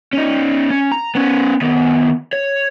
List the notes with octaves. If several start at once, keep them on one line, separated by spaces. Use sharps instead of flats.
C#4 D#4
C#4
A#5
B3 C#4
D#3 B3
C#5